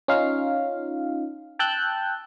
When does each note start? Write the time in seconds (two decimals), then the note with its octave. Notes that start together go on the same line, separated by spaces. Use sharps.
0.08 C#4 D#4 F4 F5
1.59 G5 A5 E6 F#6 G6